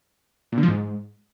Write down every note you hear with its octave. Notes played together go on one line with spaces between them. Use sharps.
A#2
D3
F3
G#2